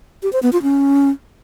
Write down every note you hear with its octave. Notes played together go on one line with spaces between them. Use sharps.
G4
C5
B3
F4
C#4